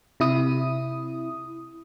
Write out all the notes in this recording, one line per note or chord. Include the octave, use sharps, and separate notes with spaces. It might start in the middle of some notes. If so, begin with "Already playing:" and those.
C3 E4 D#6